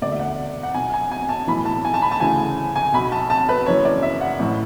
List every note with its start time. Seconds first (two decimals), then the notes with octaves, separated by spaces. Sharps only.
0.02 E1 D2 D3 D5
0.12 E5
0.19 F#5
0.63 F#5
0.74 B1 B2 G#5
0.94 G#5
1.11 G#5
1.29 A5
1.47 B1 A2 E3 B5
1.65 A5
1.85 G#5
1.94 A5
2.02 B5
2.11 A5
2.20 D2 C#3 E3 G#5
2.76 G#5
2.93 B1 B2 B5
3.12 A5
3.30 A5
3.49 B4
3.66 F#1 F#2 E3 C#5
3.85 D5
4.02 E5
4.21 F#5
4.39 A1 A2 E3